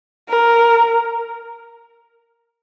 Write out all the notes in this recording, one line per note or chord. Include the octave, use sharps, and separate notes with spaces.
A#4